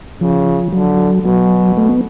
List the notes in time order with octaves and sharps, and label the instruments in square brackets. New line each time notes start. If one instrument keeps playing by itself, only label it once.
[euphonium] C#3 [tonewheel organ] F3
[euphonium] D3 [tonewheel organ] F#3
[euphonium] B2 [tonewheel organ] F#3
[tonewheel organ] A3
B3